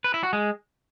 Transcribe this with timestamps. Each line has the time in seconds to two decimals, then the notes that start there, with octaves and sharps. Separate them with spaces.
0.04 B4
0.14 E4
0.23 F#4
0.33 G#3